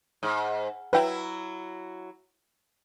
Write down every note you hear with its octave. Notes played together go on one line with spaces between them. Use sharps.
G#2 D#6
F#3 E4 B4 F#5 G5